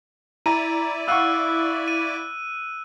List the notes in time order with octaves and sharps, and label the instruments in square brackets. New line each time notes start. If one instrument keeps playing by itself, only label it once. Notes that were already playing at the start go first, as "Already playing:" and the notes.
[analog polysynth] E4 D5 [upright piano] A#5 [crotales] D#7
[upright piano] F5 F#5 C#6 [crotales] E6 F#6 D#7
[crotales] D#7